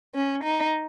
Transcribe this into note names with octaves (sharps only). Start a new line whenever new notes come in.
C#4
D#4